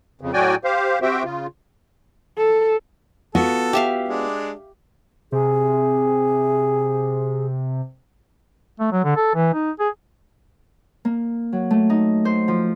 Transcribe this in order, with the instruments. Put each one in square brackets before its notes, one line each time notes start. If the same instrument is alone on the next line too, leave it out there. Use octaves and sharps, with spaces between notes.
[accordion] F2 C#3
A2 F#3 F#4 D5 G5 G#5
G4 C5 F5
C4 F#4 G4 C5 E5 G5
C#3 F4
[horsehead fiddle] A4
[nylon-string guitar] B3 F4 F#4 [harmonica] A4
[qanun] G4 E5 F5
[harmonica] G#3 D4
[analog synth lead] C3 [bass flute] G#4
[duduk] A3
F#3
D3
A4
E3
D#4
G#4
[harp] A#3
F#3
A3
D#4
C5
F3